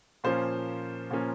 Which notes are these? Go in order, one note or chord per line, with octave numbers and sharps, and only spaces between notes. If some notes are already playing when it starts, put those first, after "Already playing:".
A#2 F3 A#3 C#4 C5
A#2 F3 A#3 C#4